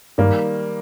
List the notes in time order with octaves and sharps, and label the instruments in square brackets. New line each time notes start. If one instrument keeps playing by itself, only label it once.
[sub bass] G2 [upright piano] D#3 G3 A#3